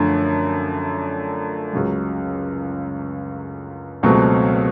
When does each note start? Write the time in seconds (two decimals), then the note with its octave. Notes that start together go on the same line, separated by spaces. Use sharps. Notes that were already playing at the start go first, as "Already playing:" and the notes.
Already playing: F#2 D3 F3 A3 D4
1.73 C#2 C#3 F#3
4.03 C#2 B2 F#3 A3 C4